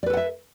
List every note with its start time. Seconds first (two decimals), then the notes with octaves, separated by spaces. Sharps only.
0.03 D5
0.06 B4
0.10 A4
0.13 F#5
0.17 E5